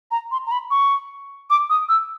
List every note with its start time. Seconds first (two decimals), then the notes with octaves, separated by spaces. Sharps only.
0.11 A#5
0.32 C6
0.46 A#5
0.52 B5
0.71 C#6
1.50 D6
1.70 D#6
1.89 E6